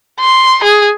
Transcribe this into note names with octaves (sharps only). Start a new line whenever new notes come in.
C6
G#4